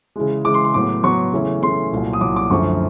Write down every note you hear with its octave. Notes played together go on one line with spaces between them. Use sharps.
C#3 E3 G#3
C#3 E3 G#3 D6
C6
C6
A2 F#3 B3 D6
A2 F#3 B3 C#6
C#3 E3 A3 C#4
C#3 E3 A3 C#4 C6
C2 A#2 F#3
D#6
C2 A#2 F#3 D6
D6
F#2 D3 F3 A3 C#6